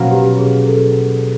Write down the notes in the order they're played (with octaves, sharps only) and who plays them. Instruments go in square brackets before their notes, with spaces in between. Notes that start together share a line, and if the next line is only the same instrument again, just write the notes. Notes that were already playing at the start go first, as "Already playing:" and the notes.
Already playing: [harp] B2 F#3 A#3 C#4 [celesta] F#4
[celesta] G4
G#4
A4